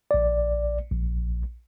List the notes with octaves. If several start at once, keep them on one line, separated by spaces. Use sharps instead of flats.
A#1 D5
A#1